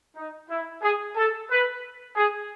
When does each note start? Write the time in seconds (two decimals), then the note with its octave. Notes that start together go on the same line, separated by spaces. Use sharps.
0.16 D#4
0.50 E4
0.82 G#4
1.16 A4
1.50 B4
2.16 G#4